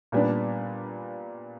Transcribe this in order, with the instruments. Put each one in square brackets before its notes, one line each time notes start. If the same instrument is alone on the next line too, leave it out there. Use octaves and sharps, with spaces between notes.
[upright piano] A#2 G3 B3 D4